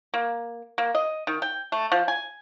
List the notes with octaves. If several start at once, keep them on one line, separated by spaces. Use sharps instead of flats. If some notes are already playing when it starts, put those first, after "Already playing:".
A#3
A#3
D#5
D#3
G5
A3
F3
G#5